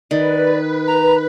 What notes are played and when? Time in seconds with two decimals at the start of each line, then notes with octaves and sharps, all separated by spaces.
0.11 D#3 B4 D5
0.87 A#5